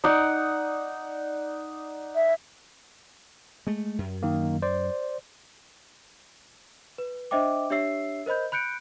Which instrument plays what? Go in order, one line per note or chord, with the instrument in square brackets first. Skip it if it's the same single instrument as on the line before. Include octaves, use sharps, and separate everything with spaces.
[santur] D#4 D5 F#5
[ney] E5
[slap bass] G#3 A3
F#2
[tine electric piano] D#3 A#3
C5 D5
[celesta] B4
D4 C5 D#5 E5 G5 D6
D4 G4 C#5 E5 E6 C7
A#4 C5 D#5 B5 G6
B5 F#6 G6 C#7 D7